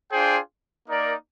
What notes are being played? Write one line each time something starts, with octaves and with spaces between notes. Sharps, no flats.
D4 F4 G#4 C5 G5
A#3 D#4 A#4 D5